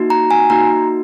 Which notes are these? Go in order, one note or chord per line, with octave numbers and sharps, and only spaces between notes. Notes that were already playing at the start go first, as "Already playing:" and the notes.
Already playing: A#3 D#4 F#4
A#5
G#5
A#3 D#4 F#4 A#5